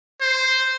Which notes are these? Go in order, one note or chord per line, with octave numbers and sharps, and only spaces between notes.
C5